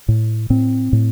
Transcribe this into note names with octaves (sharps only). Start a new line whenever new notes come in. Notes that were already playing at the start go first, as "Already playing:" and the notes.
A2
A2 C4
A2